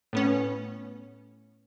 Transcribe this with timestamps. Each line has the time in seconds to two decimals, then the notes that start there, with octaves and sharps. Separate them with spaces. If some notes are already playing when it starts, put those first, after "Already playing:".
0.13 A2 B3 C#4